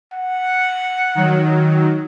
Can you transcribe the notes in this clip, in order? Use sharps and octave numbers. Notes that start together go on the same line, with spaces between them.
F#5
D#3 F#3